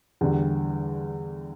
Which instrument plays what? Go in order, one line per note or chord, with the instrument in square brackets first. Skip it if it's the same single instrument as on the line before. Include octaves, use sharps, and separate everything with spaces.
[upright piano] E2 D3 G3